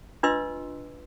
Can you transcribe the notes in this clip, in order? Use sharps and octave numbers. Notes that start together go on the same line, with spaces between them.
D4 F4 B4 D#5 C6 E6